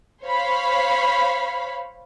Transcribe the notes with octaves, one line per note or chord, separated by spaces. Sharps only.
C5 C#5 F5 B5